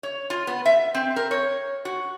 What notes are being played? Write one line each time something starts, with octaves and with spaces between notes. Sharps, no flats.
C#5
F4
B3
E5
C4
A#4
C#5
F#4